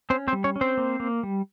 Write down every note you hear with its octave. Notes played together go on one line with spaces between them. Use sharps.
C4 C#4 C5
C4 C5
G3
C#4 C#5
C#4
C4 C5
A#3
A#3
G3